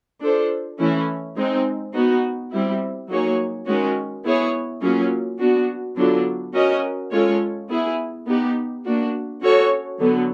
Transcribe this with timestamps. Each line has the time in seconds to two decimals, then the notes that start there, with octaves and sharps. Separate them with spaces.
0.21 D4 F4 A4 C5
0.79 E3 A3 C#4 E4
1.36 G#3 C4 D#4
1.94 B3 D#4 F#4
2.51 G3 C4 E4
3.09 F#3 A#3 D#4 G#4 C#5
3.66 D#3 G#3 C#4 F#4
4.23 B3 E4 G#4 C#5
4.81 F#3 A#3 C#4 F4 G#4
5.39 B3 D4 F#4
5.96 D3 F#3 B3 D4 F4
6.54 C#4 F#4 A#4 D#5
7.11 G#3 C#4 F4 A4 C#5
7.69 B3 E4 G#4
8.26 B3 D#4 G4
8.84 A#3 D4 F#4
9.41 C#4 F#4 A4 C#5
9.99 D3 F#3 B3